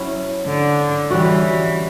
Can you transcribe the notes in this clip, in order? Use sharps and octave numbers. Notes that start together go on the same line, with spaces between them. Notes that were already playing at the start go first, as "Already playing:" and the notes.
Already playing: F#3 C#4 E4
D3
E3 G3 C#4 F#4